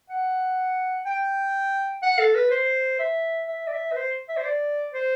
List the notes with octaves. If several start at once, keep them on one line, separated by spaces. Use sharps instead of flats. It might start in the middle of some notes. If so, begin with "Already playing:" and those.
F#5
G5
F#5
A4
B4
C5
E5
E5
D5
E5
B4
C5
E5
C5
D5
C5